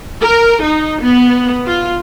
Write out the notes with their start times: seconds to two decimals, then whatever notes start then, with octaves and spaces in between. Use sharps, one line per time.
0.21 A#4
0.64 D#4
1.01 B3
1.67 F4